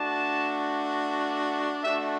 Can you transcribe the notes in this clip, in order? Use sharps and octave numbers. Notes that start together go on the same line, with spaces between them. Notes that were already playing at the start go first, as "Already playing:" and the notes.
Already playing: A3 D4 F#4 A5
A3 D4 F#4 E5